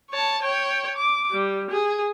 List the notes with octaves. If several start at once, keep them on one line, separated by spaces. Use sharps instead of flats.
C#5 A5
C#5 G5
D6
G3
G#4